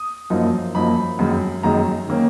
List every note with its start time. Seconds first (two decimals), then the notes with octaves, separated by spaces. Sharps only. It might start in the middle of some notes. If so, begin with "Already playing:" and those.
Already playing: D#6
0.30 F#2 F3 A#3 D#4
0.75 F#2 F3 A#3 D#4 B5
1.19 F#2 D#3 G#3 D#4
1.63 F#2 D#3 G#3 D#4 A#5
2.08 D#3 A#3 C#4